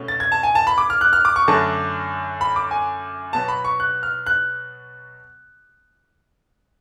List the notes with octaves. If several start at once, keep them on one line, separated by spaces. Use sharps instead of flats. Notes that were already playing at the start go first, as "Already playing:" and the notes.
Already playing: B2 A3 C#4
A6
G#6
A5
G#5
A5
B5
D6
F6
F#6
F6
D6
C#6
F#2 D3 F#3 A3 A5
B5
D6
G#5
B2 F#3 B3 A5
B5
C#6
F#6
F6
F#6